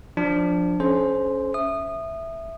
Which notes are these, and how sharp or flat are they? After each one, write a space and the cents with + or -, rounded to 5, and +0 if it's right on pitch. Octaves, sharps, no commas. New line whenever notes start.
F3 +15 D4 +0
C#4 +0 G#4 +45 C5 +0
E5 +0 D#6 -20